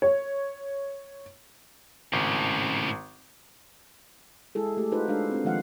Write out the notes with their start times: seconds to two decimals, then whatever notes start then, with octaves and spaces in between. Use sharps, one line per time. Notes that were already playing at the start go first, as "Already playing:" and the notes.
0.02 C#5
2.13 G#1 A2 C#3
4.55 G#3 E4 G#4 A4
4.77 A3 G4
4.92 D#4 F4 F#4 B4 C5
5.08 G#3 D4 A4 F5
5.31 C4 D4
5.44 D#3 F3 G#3 F5 F#5